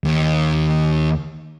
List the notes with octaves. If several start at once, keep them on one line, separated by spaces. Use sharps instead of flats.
D#2